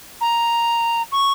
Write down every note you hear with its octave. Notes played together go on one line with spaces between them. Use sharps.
A#5
C#6